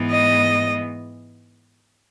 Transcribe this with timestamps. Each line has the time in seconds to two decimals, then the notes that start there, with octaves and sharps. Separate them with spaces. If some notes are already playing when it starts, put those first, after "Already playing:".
Already playing: G#2 E3 G#3 B3
0.10 D#5